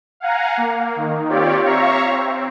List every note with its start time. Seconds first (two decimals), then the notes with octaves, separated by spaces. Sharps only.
0.20 F5 F#5 G#5 A#5
0.57 A#3
0.96 D#3
1.28 C4 F4 G4 C#5 D5
1.65 C#5 E5 F5 A#5 C#6
2.08 C4